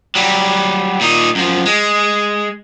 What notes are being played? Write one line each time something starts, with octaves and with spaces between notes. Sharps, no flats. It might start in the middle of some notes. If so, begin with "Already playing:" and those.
F#3 G3
A#2 D#4
F#2 F3
G#3